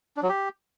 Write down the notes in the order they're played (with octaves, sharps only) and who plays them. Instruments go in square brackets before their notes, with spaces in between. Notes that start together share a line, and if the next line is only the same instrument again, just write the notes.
[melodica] D4
F#3
G4